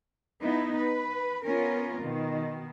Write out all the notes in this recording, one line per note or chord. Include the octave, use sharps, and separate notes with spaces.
B3 D#4 E4
B4
B3 C#4 F4 A#4
B2 D#3